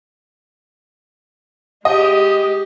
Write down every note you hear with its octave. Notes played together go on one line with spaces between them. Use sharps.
G#3 G4 D#5